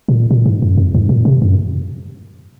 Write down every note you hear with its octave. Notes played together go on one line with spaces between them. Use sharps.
A#2
A#2
G#2
F#2
F2
G#2
A#2
C3
F#2